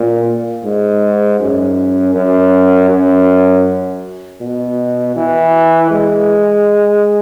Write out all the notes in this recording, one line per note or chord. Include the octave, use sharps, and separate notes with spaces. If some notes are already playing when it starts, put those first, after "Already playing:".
Already playing: A#2
G#2
F#2
F#2
F#2
B2
E3
G#3